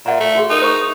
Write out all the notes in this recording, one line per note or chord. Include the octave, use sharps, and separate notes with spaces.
A#2 E5 F#5 A#5
A3
F4 F#4 G#4
D#4 A#4 G#5
C5 A#5 C#6